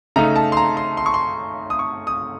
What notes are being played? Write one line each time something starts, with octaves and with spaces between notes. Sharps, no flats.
C#3 A3 D#4 A#5
A5
C6
A#5
C6
C6
C#6
C6
D#6
C#6
D#6